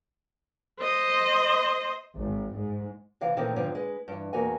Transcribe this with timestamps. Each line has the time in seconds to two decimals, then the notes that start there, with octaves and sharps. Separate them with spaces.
0.80 C5 D#5
2.17 G#1
2.55 G#2
3.21 C3 E3 F5
3.37 A#2 D#3 E3 A3 C4 D#4
3.56 G#2 D3 F3 B3 C4
3.75 G#3 B4
4.08 G2 E3
4.33 E2 A2 A#3 F#4 G#5